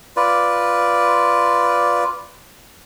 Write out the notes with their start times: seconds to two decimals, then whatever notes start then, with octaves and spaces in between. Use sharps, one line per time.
0.17 F4 B4 D5